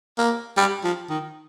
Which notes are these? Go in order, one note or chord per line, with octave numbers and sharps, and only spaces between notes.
A#3
G3
F3
D#3